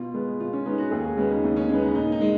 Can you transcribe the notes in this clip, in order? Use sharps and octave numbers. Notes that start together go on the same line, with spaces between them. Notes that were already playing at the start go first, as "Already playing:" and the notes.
Already playing: B2 F4
G#3 B3
B2 F4
C#4
G#3 B3 D#4
F#4
D#2 G#4
F#4
C#3 G#3 B3 C#4
D#4
D#2 D#4
C#4
C#3 G#3 B3 C#4
D#4
A#2 D#4
D#4
G#3